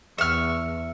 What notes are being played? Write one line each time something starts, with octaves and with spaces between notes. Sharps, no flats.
E2 E5 C#6 F6